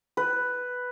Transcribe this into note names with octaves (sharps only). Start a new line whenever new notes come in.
B4